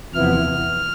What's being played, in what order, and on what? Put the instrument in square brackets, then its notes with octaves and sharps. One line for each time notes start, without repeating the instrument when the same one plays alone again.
[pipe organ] E2 C3 F3 B3 E4 F6